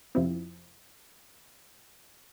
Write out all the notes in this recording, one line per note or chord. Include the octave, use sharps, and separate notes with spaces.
F2 C3 F3 C4 E4